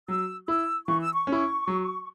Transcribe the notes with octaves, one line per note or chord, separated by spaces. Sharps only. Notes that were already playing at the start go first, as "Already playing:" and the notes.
F#3 E6
E4 E6
E3 C#6
E6
C#6
C#4
E4
F#3